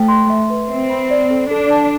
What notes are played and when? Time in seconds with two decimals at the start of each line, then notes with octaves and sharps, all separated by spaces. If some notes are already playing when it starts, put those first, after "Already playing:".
Already playing: A3 C5 G5
0.08 C6
0.30 E5
0.50 B4
0.69 C4 E5
0.90 B5
1.11 D5
1.31 A4
1.50 D4 A4
1.70 A5